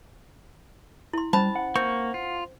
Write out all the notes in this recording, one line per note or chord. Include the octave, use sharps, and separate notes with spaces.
E4 C6
G3 C#4 C5 A5 B5
F#5
A#3 C4 C#6
F4